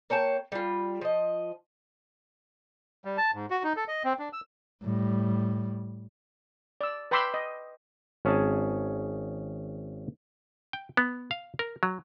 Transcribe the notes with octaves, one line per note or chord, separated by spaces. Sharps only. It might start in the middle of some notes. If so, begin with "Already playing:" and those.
A#3 C#5 G5 A5
G3 F4
F3 D#5
G3
A5
G#2
F#4
D#4
A4
D#5
C4
D4
E6
A2 G3
D5 E6
B4 G5 B5 C6 D6 E6
D#5
G#1 C#4 G#4 G#5 A5
G5
B3
F5
A#4
F#3